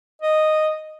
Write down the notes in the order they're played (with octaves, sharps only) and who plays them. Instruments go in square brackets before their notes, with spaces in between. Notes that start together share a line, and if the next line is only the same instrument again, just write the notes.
[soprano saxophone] D#5